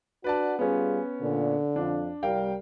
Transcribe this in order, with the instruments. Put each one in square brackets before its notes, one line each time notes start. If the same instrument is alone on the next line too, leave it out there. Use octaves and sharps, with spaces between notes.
[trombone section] D4 F#4 [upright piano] B4 D5 A5
[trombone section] G3 F4 G#4 [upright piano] B3 C#4
[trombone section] A#2 [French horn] D3
[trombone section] F2 F4 [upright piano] D4
[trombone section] C2 [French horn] G3 [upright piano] A#4 F5 G5